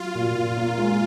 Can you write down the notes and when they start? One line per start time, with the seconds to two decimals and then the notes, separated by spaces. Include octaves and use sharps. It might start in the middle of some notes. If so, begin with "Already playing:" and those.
Already playing: F#3 F4
0.15 A#2
0.35 A#2
0.57 A#3
0.78 G#3